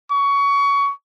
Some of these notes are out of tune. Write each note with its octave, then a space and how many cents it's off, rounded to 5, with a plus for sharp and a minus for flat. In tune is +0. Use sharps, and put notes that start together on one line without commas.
C#6 +20